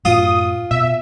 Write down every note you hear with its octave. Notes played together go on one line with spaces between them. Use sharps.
F#2 A2 F#3 F4 D#6
B2 E5